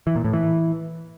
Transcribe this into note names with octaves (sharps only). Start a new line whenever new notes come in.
E3
A#2
A2
E3